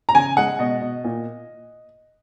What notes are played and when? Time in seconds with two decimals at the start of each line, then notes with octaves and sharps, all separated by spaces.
0.09 A#5
0.15 C#3 G#5
0.37 G#3 F#5
0.59 B2 D#5
0.81 B2
1.04 A#2